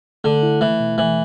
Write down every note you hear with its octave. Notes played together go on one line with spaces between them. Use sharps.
D3 A3
E4
E3 A3
B2
E3 A3